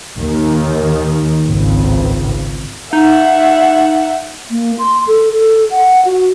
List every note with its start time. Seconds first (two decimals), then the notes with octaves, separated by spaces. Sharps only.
0.17 D#2 D#3
1.45 G#1 C#2
2.93 D#4 E5 F#5
4.51 A#3
4.79 C6
5.07 A4
5.32 A4
5.71 F#5
6.05 F#4